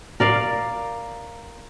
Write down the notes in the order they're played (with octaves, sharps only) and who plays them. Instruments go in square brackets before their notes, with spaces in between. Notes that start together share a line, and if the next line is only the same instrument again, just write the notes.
[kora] A#4 D5 F5